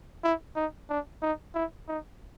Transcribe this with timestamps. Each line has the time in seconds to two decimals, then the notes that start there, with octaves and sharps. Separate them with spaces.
0.24 E4
0.56 D#4
0.89 D4
1.22 D#4
1.55 E4
1.88 D#4